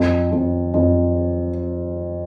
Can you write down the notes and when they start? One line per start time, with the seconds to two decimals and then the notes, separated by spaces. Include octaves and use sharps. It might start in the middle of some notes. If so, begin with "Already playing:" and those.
Already playing: F2
0.32 F2
0.74 F2